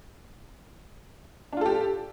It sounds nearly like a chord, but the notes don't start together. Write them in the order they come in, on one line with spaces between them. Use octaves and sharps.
D4 F4 A4 G4